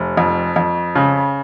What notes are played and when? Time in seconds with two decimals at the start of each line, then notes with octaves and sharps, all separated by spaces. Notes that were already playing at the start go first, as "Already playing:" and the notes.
Already playing: F1
0.17 F2
0.56 F2
0.95 C#3